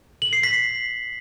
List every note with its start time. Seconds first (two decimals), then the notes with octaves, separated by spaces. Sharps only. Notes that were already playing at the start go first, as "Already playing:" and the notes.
0.22 F#7
0.33 C7
0.43 B6